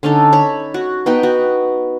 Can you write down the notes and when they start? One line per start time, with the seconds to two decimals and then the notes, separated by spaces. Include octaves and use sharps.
0.03 D3 C#4 D#4 A4
0.33 C#5 B5
0.74 F#4
1.06 B3 D#4 B4 G5
1.23 F#4